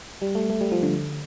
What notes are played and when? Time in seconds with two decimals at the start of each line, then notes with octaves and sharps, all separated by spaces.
0.22 G3
0.35 A3
0.50 A3
0.61 G3
0.72 F3
0.83 D3